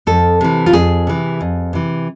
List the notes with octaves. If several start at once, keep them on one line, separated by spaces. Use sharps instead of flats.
F2 A4
C3 E3
F4
F2 G#4
C3 E3
F2
C3 E3